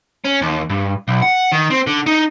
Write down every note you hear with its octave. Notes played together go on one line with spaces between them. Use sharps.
C#4
D#2
G2
B1
F#5
D#3
C4
D3
D#4